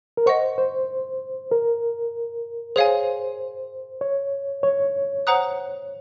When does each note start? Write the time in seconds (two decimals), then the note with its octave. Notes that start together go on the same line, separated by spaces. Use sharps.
0.17 A#4
0.26 C5 D#5 F#5 C#6
0.58 C5
1.51 A#4
2.76 G#4 C5 C#5 F5 G#5
4.01 C#5
4.63 C#5
5.27 C5 F#5 A#5 D#6 F#6